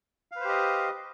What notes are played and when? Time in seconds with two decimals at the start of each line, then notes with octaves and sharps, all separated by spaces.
0.32 F5
0.36 B4
0.40 C5
0.44 G4
0.49 D#5